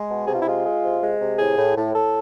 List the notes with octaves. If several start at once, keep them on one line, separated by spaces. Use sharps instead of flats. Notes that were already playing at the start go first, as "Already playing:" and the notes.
Already playing: G#3
B2
C3 G#4
F4
E4
G#3 F4
G#3
C3
G#3
C3
A2 G#4
A2
A2
A2 A4